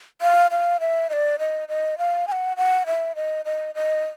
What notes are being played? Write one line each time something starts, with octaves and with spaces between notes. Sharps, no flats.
F5
F5
E5
D#5
D5
D#5
D#5
F5
G#5
F#5
F#5
E5
D#5
D#5
D#5